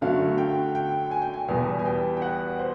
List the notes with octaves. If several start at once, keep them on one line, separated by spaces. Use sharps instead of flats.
F#2 D3 F#3 A3 F5
G5
G5
G#5
G5
G#5
E2 B2 G3 G#5
G#5
G5
G5
F#5
C5